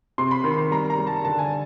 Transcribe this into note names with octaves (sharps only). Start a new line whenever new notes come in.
C3 C6
B5
D#3 C6
C6
G3 A#5
A#5
G3
A5
D3 A5
G#5